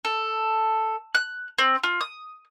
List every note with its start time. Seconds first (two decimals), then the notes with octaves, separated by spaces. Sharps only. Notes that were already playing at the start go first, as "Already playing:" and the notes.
0.05 A4
1.15 F#6
1.58 C4
1.84 F4
2.01 D#6